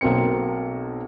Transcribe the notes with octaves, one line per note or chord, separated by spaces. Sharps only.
B1 F#3 A#3 C4 C#7